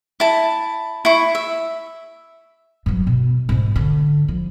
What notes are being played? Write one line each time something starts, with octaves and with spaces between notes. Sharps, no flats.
E4 A5
E4 C#6
E5
G2 F#3
B2
G#2 C#3
D3
F3